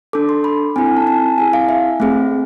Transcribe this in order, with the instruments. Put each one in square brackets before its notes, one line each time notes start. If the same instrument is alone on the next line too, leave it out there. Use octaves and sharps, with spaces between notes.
[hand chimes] D4 A4 D6
C6
B5
C4 E4 A4 G#5
G#5
A5
A5
C4 E4 G#4 G#5
F5
E5
A3 C4 G#4